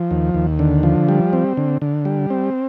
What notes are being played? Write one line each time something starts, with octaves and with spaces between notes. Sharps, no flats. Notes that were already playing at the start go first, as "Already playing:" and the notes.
Already playing: F3
D#2
D#2
D3
F3
G3
C4
D3
D3
G3
C4